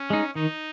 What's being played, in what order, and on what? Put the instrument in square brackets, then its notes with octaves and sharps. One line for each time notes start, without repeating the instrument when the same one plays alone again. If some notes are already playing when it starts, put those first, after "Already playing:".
Already playing: [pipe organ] C#4
[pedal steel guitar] G#3 D#4
[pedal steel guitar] D#3 [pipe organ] D#4